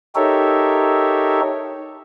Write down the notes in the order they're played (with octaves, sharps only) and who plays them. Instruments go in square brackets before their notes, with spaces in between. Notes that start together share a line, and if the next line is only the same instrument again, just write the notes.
[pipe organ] D#4 G4 A4 A#4 C#5 E5